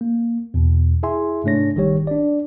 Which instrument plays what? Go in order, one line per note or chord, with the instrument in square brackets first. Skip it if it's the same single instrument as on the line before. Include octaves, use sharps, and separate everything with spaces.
[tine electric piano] A#3
E2 B2
E4 G#4 E5 G#5 C6
G#2 C3 A3 D4 C#5 A#6
G#1 D#3 G3 G4 C#5
D4 D5